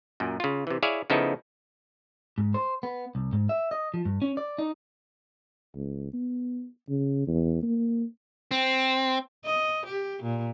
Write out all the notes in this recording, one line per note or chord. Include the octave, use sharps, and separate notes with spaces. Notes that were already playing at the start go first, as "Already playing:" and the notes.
F#2 A#2
C#3 F4
C3 E3
E4 G#4 C#5 D5 E5 F5
C#3 F3 B3 D#4 E4 A4
G#2
C5
B3
C2
G#2
E5
D#5
F3
G2
C#4
D5
D#4
C#2
B3
C#3
E2
A#3
C4
D#5
G4
A#2